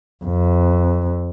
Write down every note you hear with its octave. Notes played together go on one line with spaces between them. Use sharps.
F2